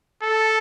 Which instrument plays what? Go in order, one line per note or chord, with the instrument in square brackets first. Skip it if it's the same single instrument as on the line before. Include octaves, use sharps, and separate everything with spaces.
[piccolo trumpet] A4